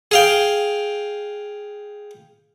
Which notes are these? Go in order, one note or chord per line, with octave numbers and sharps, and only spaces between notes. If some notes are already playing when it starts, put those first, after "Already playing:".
G#4 F5 G5